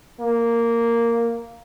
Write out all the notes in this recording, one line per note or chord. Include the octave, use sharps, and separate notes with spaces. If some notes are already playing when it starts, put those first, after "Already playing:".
A#3